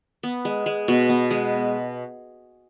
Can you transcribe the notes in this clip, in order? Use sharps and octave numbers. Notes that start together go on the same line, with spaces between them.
B3
G#3
G#3
B2
B3
G#3